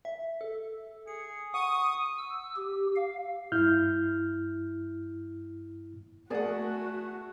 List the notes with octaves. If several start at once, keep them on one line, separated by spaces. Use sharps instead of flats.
E5
A4
G#4 C#7
F#5 C#6 D#6
E6
G4
F5
G2 E4 F6 G6
A3 F#4 G#4 A#4 D5 F#5 A5